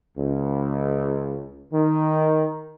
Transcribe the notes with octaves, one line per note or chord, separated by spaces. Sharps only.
C#2
D#3